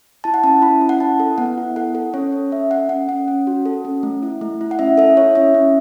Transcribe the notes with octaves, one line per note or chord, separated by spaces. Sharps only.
E4 A5
F#5
C#4 A5
E4 B5
C#4
F#5
E4 A5
A4
B3 F#5
E4
A4 F#5
A4
C#4 C#5
A4
C#4 E5
A4 F#5
C#4 F#5
C#4 F#5
C#4
F#4
A4
C#4
A3
E4
A3
E4
F#5
C#4 E5
A4 E5
E4 C#5
C#4 E5
C#4